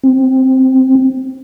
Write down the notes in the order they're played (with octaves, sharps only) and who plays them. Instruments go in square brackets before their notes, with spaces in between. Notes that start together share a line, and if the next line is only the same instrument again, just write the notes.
[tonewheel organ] C4